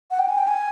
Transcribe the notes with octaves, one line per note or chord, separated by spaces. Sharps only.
F#5
G5
G#5
G5
G#5